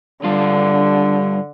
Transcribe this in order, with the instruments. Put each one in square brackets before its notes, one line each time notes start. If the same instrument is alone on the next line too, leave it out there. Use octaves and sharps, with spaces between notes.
[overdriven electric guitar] G2 F4 [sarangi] D3